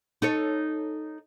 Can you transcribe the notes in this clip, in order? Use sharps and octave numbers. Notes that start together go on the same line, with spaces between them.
D#4 A4 C#5